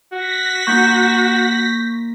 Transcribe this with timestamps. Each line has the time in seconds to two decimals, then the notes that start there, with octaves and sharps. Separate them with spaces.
0.12 F#4 A#6 B6
0.67 A#3 D#4 F4 C#6 G6